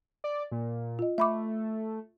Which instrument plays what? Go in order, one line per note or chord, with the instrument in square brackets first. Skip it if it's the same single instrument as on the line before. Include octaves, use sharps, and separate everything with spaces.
[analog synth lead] D5
A#2
[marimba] F4 D#5
[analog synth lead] A3 [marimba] E5 B5 D6